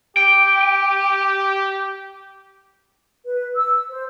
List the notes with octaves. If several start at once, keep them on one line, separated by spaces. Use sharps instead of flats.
G4 G5
B4
E6
C5